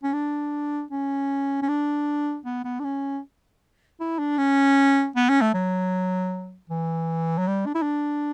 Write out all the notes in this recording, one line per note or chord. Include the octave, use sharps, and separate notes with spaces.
C#4
D4
C#4
C#4
D4
B3
B3
D4
C#4
E4
D4
C#4
B3
C#4
A3
F#3
E3
F#3
G3
D4
E4
D4